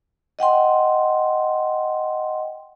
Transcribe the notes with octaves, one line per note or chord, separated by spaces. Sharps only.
D#5 F#5 G5 C6